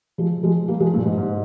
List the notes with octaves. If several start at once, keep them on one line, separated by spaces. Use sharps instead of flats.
F3 G#3
F3 G#3
G3 A#3
F3 G#3
G2 A#2
G#2
G#2